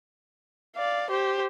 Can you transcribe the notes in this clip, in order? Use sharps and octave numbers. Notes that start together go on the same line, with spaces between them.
D5 F5
G4 C5